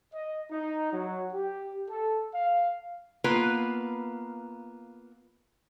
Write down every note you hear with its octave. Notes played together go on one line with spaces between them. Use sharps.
D#5
D#4
F#3
G4
A4
F5
A#3 B3 F4 B4